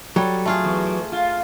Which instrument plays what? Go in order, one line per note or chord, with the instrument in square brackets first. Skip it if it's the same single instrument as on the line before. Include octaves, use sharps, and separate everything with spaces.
[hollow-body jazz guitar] F#3 [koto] G3 [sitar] A4
[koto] A3 F4 G#4
[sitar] E2
F4